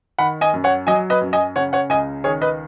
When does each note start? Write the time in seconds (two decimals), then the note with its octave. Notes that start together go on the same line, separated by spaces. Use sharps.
0.18 D#3 F#5 B5
0.41 D#5 G#5
0.54 F#2
0.64 C#5 F#5
0.87 F#3 D#5 G#5
1.10 B4 D#5
1.21 F#2
1.33 D#5 G#5
1.56 C#3 C#5 F#5
1.73 C#5 F#5
1.90 C#2 D#5 G#5
2.24 D#3 G#4 C#5
2.42 B4 D#5